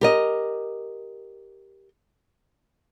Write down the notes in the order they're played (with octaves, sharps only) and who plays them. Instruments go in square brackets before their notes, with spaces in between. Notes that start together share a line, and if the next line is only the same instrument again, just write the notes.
[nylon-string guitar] G4 A#4 D#5